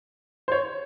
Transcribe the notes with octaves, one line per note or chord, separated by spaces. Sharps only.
C5
C#5